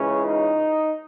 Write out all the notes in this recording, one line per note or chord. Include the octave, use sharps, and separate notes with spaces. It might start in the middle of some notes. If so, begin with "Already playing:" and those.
Already playing: C#2 C#3 E3 C#4
D#4